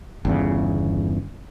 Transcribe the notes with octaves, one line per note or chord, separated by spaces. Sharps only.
G1 E2 C#3